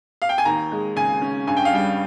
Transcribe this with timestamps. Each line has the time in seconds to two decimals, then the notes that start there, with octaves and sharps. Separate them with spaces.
0.22 F5
0.29 G5
0.38 G#5
0.45 D#2 A#5
0.72 G#3
0.96 C#3 G#5
1.21 C#4
1.47 G2 G#5
1.57 G5
1.65 F5
1.72 G3 G5